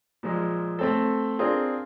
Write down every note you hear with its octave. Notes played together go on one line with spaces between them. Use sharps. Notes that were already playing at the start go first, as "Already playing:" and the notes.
A#2 F3 G#3
A3 C4 A4
C4 D4 F4 G#4 A#4